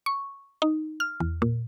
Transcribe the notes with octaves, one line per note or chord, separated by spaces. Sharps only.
C#6
D#4
F6
E2
A#2